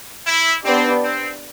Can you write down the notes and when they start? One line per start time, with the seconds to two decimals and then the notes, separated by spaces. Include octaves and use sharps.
0.27 E4
0.65 B3 C4 D4 G4 D5
1.02 C4